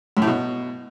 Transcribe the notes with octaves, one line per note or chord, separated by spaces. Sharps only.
F#2
A2
B2